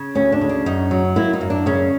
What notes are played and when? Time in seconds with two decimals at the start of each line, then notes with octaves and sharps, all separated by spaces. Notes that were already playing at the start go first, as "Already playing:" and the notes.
Already playing: C#3
0.15 D2 C#4
0.32 D4
0.41 C#3
0.49 D4
0.66 F#2 D#4
0.91 F#3
1.16 A#3 E4
1.33 D#4
1.41 F#2
1.50 D4
1.66 C#3 C#4